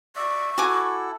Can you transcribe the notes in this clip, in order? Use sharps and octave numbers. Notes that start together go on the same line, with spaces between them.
D5 E5 C#6
E4 F#4 A4 G#5 D6